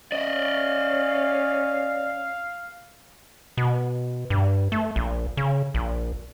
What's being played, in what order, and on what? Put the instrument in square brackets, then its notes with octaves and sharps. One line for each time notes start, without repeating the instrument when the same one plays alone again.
[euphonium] C#4 [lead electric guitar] D5 D#5 [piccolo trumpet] F5
[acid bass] B2
G2
A3
A#1
C#3
A#1